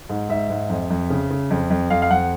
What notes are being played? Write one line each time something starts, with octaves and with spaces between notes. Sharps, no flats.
G#2
G#2 E5
G#2
F2
F2
C#3
C#3
F2
F2
F2 F5
F5
F2 F#5